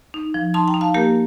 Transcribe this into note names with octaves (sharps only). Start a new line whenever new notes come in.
D#4
F3
D#4 A5 C6
G5 A#5
D#4
F5 A5
A#3 G4 A#4